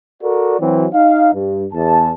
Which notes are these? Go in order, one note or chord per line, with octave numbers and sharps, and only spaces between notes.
F#4 A4 A#4 D5
E3 F#3 C4
D#4 F5
G2
E2 A5